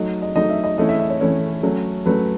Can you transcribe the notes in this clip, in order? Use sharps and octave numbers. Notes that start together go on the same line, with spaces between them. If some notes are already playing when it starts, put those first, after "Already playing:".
Already playing: F#3 A3 D#4 D#5
D#5
F#3 A3 D#4 D#5
E5
D#5
E3 A3 C#4 E4 D#5
E5
E5
C#5
E3 A3 C#4 E4
F#3 A3 C#4
F#3 A3 C#4 B4